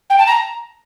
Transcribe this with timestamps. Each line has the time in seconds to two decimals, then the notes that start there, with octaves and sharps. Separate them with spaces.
0.10 G5
0.18 A5
0.27 A#5